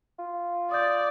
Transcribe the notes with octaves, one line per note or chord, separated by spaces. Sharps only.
F4
D5 D#6 G6